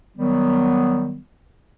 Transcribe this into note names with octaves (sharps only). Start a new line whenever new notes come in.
D#3 F#3 G3 B3